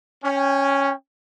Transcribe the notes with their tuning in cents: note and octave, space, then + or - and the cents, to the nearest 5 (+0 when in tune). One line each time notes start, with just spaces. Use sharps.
C#4 +0 G5 +35